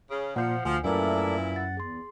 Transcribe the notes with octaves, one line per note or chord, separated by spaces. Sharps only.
C#3
A#2 F3 F#5 G6 C#7
D2 F3 G#5
F#2 A#2 A3 E4 A#4 B4 D5 G#5
F#5 A6
E2 G#4 C6